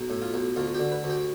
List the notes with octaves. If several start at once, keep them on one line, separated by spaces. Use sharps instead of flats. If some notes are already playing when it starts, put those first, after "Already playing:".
Already playing: B1
A2
F4
B1
D2 F4
D3 G4
B4
D2
G4